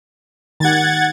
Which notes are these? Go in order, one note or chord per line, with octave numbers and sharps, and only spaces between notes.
D#3 G4 F#5 G#6 A6